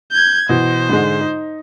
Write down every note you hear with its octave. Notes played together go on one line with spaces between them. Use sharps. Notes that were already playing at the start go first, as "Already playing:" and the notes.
G6 G#6
B2 E3 C5
G#2 D3 G#3
D#4